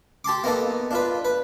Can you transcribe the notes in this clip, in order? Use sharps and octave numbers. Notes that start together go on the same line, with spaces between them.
G4 A5 C6 D6
A#3 B3 D#4 A4
D4 F4 B4
B4